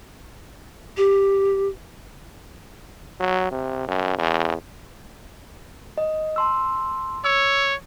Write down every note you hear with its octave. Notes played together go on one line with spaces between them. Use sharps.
G4
F#3
C3
F#2
E2
D#5
A5 C6 E6
C#5 E6